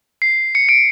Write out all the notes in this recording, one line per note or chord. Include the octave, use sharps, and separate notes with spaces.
C7
C#7
D7